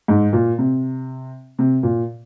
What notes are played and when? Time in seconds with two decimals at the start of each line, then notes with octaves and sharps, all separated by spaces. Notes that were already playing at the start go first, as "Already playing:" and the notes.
0.08 G#2
0.33 A#2
0.58 C3
1.59 C3
1.83 A#2